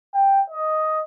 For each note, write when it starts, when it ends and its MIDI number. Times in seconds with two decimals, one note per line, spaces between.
0.14 0.41 79
0.50 1.00 75